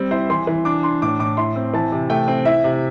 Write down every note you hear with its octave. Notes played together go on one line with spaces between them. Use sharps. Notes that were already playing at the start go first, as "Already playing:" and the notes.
Already playing: G3 C4
E4 C5
E3 C6
E3
D4 D6
D4 C6
A2 D6
A2 D6
E4 C6
C4
E3 A5
C3
A3 G5
C4
E4 E5
C3